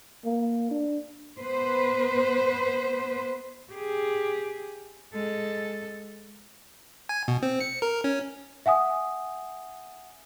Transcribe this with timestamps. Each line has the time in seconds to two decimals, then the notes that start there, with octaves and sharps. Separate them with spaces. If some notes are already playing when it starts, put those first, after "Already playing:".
0.25 A#3
0.71 D4
1.40 B3 B4 C5
3.73 G4 G#4
5.14 G#3 A4
7.09 G#5
7.28 B2
7.42 C4
7.60 C#7
7.82 A#4
8.04 C#4
8.66 E5 F#5 G#5 D#6